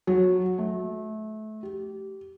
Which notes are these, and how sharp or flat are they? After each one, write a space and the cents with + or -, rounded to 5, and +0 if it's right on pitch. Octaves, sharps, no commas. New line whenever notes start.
F#3 -15
A3 -25
G4 -20